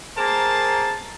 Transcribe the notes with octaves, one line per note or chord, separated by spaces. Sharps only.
A#3 G#4 A#4 C5 A5